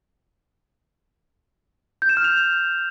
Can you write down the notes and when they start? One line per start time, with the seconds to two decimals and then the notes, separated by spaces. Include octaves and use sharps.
2.02 G6
2.09 E7
2.17 F6
2.24 F7